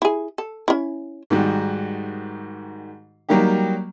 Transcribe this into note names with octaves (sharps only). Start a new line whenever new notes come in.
E4 G#4
A4
C#4 E4
G#2 D#3 G3 F#4
F#3 G3 A#3 D#4 G4